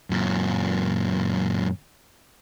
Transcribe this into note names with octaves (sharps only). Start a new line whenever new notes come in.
F#2 A#2